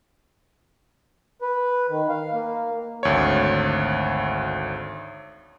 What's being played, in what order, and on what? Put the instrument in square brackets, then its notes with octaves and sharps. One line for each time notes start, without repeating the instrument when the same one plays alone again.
[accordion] B4
D#3
F5
A#3
[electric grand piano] G#1 D2 C#5